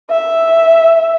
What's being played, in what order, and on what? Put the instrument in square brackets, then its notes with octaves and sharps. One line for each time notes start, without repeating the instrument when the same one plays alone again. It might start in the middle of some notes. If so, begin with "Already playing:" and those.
[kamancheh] E5